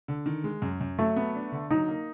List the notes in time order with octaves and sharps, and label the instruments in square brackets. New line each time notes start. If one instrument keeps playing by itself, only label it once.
[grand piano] D3
D#3
G#3
F#2
F#2
[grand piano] F#3 [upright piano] A3
[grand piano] B3
D4
D3
[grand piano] F#3 [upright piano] D#4
[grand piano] A#3